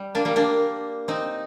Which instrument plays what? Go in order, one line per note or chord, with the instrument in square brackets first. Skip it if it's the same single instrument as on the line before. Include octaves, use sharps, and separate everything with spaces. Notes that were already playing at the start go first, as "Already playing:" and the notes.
Already playing: [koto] G3
A#3 D4
G3 A#3
A#3 D4
C4 D#4